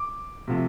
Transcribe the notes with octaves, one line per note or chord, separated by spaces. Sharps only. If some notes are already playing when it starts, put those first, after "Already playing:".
Already playing: D6
C3 F3 A3